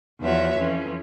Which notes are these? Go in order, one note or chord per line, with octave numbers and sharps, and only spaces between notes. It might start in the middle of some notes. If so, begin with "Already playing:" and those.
E2 F3 B3 F#4 C#5 E5
F2 E3 F3 C#4